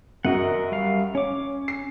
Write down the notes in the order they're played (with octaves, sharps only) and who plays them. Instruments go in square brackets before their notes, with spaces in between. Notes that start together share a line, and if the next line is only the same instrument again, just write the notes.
[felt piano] F#2 F#4 [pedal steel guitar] A#4 D#5 F#5
[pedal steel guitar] G3 F5
[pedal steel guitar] C#4 D6 [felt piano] C#5
[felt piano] C7